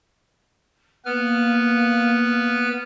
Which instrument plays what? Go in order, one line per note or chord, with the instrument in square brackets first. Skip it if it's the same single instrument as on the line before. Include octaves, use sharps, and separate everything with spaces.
[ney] A#3 [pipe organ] B3 B4 F6